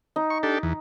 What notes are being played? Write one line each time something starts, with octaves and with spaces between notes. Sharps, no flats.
D#4
C#6
D4 G4 A4
E2